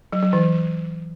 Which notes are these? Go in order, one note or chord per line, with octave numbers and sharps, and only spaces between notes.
F#3
F#3
E3